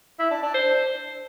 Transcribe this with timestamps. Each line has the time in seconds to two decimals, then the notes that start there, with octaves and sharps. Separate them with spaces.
0.19 E4
0.31 D4
0.43 D4
0.54 C5